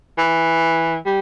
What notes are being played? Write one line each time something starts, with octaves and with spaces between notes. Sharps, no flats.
E3
G3